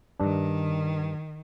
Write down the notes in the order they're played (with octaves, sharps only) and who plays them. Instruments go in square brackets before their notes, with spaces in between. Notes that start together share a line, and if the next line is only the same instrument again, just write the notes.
[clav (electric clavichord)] G2 D4 [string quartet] D#3